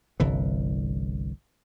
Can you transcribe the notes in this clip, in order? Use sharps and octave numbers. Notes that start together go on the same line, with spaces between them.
G1 C2 E3